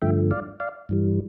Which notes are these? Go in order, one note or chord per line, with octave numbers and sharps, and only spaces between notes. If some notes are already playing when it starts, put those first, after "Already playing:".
G2 D3 F3 A3 E5 G5
D5 F5
D5 F5
G2 E3 G3